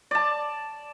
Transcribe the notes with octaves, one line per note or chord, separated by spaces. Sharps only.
D5 A5